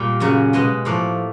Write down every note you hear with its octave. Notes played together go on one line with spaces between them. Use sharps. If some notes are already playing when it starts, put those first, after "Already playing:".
Already playing: A#2 G3 A#3 G5
F#2 C#3 F#3
B2 G#3 B3 D#5
A2 F3 A#3 D5